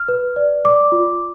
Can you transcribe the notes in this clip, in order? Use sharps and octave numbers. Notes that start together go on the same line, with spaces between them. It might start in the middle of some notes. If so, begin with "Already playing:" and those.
Already playing: F6
B4
D5
D5 D6
F4